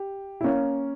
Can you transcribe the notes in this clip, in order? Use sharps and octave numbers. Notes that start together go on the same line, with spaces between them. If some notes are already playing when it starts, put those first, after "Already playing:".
Already playing: G4
E4
A#3 C#4